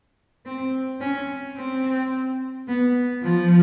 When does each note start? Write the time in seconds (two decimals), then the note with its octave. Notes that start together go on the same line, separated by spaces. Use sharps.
0.46 C4
1.01 C#4
1.57 C4
2.68 B3
3.23 F3